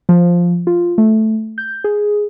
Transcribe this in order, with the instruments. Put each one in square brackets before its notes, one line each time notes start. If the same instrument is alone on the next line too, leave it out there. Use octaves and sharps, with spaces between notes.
[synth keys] F3
F4
A3
G6
G#4